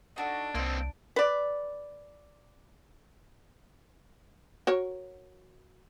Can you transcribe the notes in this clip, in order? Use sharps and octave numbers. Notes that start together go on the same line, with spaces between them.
D4 D#4 F#4 A4
C2 A#3 C4 D#4 F4 E5
B4 D5
F#4 A#4 C#5